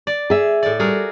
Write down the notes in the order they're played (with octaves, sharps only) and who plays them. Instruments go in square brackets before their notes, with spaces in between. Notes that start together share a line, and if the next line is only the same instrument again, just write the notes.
[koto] D5
[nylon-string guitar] G#4 E5
[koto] A2 D5
[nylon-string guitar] G3 [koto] F#4 G#4 A#4